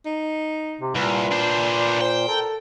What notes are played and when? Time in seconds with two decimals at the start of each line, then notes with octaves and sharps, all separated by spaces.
0.06 D#4
0.81 C3
0.96 C2 A#2 B4
1.32 D4 C5
2.01 C5 G5
2.28 A4 A#4